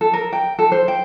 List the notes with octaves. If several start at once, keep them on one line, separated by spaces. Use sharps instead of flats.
A4
A#4
G5
A4
C5
G5